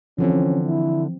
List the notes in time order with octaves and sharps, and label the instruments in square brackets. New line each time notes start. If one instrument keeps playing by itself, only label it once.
[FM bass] D3 [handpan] E3 F3 C4 [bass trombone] C#4
[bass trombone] E4